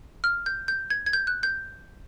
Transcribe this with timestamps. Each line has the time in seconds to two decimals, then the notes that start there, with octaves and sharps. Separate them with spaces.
0.24 F6
0.46 G6
0.68 G6
0.90 G#6
1.06 G#6
1.13 G6
1.27 F#6
1.43 G6